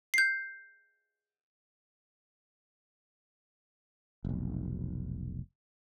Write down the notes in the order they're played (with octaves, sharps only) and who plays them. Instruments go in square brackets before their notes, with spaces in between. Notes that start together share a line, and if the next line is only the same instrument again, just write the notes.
[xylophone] G6 C7
[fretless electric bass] F1 B1